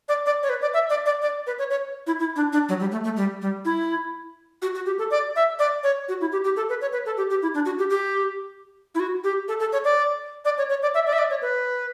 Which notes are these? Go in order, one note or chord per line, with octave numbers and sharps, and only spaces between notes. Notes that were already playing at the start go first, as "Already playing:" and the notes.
D5
D5
C#5
B4
D5
E5
D5
D5
D5
B4
C#5
C#5
E4
E4
D4
D4
F#3
G3
A3
A3
G3
G3
E4
F#4
F#4
G4
A4
D5
E5
D5
C#5
F#4
E4
G4
G4
A4
B4
C#5
B4
A4
G4
G4
E4
D4
F#4
G4
G4
E4
F#4
G4
A4
A4
C#5
D5
D5
C#5
C#5
D5
E5
D5
E5
D5
C#5
B4